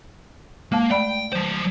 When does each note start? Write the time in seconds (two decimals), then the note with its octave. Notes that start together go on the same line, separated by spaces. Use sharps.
0.72 G#3 A#3 F5 A5
0.91 A3 D5 G5 B5
1.32 F#3 C5